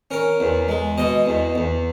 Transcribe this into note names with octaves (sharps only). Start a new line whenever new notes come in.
C#4 A#4
E2
G#3
B2 D#5
E2
E2